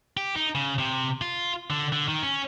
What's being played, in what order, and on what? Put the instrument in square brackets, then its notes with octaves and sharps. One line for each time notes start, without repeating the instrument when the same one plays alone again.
[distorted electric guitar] G4
D#4
C#3
C3
F4
D3
D3
D#3
C#4